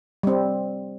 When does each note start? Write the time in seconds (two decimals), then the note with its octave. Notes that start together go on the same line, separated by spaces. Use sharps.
0.23 G3 C4